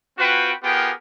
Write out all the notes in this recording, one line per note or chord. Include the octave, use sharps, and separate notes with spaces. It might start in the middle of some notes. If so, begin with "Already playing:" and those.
C4 F4 F#4 B4 G5
B3 F4 G4 G#4 A#4 G5